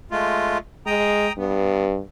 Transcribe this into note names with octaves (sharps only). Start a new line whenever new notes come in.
G#3 A3 F4
G#3 G5 A#5 D#6
G2 B3